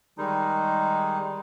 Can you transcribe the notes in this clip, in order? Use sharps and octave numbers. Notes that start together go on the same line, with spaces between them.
D#3 G3 G#3 D#4